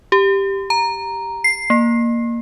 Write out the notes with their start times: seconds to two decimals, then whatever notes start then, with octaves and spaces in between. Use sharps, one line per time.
0.12 G4
0.70 A#5
1.44 C7
1.70 A#3